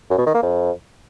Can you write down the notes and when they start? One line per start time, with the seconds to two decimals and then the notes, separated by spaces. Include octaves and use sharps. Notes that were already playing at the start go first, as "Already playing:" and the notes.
0.10 F#2
0.18 B2
0.26 D#3
0.34 A#3
0.42 F2